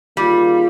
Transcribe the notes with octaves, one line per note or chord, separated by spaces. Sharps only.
D#3 G3 A#3 F4 G#4